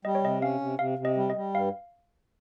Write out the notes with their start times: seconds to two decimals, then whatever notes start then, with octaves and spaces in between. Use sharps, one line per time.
0.05 G3 D#5
0.15 C#5
0.23 C3 D#5
0.41 C#4 F5
0.61 C3
0.79 C3 F5
0.99 C3
1.05 D#5
1.16 G3
1.30 D#5
1.35 G3
1.54 G2 F5